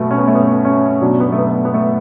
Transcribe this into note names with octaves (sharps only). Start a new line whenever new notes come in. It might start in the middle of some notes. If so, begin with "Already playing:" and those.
Already playing: B2 F#3 A3 B3
C#4
B3
A3
B3
C#4
B2 F#3 D4
B3
A3
B3
A3
B3
A3